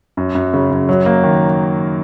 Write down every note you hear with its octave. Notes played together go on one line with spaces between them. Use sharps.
F#2
F#2
C#3
F#2
F#3
A#3
D#3